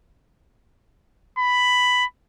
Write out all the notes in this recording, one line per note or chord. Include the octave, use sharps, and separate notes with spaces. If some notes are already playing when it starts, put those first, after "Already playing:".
B5